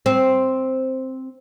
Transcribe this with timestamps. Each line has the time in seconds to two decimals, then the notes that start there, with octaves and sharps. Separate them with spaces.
0.06 C4